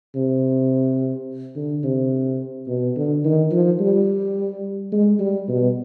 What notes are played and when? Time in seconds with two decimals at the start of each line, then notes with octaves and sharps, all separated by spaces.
0.15 C3
1.56 D3
1.84 C3
2.67 B2
2.96 D3
3.25 D#3
3.52 F3
3.80 G3
4.92 G#3
5.20 G3
5.48 B2